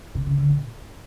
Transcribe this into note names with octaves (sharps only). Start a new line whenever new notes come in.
C3
C#3
D3
A#2